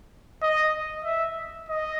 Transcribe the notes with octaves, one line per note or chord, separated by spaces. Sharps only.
D#5
E5
D#5